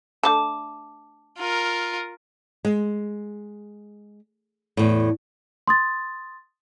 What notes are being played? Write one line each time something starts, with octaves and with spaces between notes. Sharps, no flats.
A3 D4 A4 A5 D6
F4 A#4
G#3
E2 A2
C6 D#6 A6